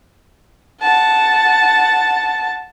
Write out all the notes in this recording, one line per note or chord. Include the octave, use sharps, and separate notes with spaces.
F#5 A5